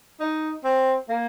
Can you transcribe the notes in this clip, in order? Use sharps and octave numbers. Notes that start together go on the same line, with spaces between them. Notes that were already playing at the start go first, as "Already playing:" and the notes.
D#4
C4
A#3